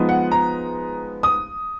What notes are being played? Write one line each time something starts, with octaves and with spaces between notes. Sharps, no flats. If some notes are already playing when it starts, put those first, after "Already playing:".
Already playing: F3 G#3 B3 D#4
F#5
A#5
D#6